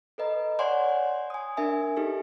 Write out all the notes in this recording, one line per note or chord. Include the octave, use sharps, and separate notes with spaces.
A4 B4 D#5 A#5
C#5 D5 F#5 G#5 C6
G#5 D#6
D4 A#4 E5 G#5
D#4 G4 A4